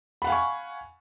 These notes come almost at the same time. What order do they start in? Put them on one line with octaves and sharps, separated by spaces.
B5 F#5 F5 G#5 C#6